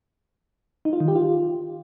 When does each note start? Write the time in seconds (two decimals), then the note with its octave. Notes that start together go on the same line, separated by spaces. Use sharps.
0.85 D#4
0.93 F4
1.00 D#3
1.08 G4
1.16 F4